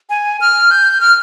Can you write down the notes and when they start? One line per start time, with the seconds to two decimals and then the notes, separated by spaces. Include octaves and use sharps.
0.10 G#5
0.41 F6
0.71 G6
1.01 F6